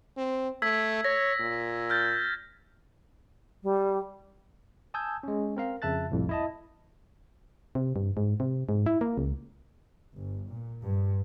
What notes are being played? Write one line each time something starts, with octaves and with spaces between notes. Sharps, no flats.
C4
A3 E6 G#6 B6
C#5 A#6
A#2
F6 G6 A6
G3
G#5 A5 D#6 E6 G6 G#6
G#3 C#4
C4 A#4 F5
F2 C#3 E5 A5 F#6 A6
G1 C2 F2 A2
E4 D#5 A5
C3
G2
G#2
C3
G#2
E4
A#3
C#2
G1
A#2
G2